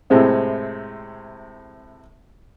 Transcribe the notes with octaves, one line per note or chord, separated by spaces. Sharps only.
A2 C3 G#3 C4 E4